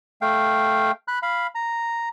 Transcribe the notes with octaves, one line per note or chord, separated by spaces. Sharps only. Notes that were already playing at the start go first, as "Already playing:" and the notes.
A3 F5 G5
B5 F#6
F5 B5
A#5